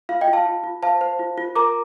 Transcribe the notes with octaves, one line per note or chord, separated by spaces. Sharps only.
F4 F5
D#5 G5
F4
F5 A5
F4
F4
C5 F5 A5
C5
F4
F4
A#4 A#5 D6